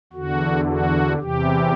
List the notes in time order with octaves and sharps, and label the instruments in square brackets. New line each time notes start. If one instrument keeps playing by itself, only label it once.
[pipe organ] E2 D3 F#4
F#4
E2 C3 E3 G4